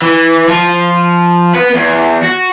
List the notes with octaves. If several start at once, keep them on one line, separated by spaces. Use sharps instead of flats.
E3
F3
B3 B4
E2
F#4